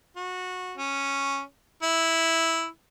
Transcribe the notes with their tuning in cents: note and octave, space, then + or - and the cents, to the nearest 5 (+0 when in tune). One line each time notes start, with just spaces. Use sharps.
F#4 -20
C#4 -5
E4 -5